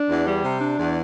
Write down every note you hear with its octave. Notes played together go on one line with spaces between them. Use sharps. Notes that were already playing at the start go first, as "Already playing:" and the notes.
Already playing: D4
E2
G3
C3
D4
E2